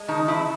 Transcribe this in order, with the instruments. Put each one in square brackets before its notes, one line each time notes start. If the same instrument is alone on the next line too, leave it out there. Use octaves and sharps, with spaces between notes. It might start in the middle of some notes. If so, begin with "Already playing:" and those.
Already playing: [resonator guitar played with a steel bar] G#3
D#3 D#4
E3 E4